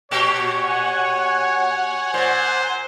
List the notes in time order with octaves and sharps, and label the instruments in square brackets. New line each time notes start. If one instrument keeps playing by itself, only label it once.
[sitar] A#2 F#4 G4 [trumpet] C#5
[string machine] F#5 G#5
[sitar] A#2 [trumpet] C5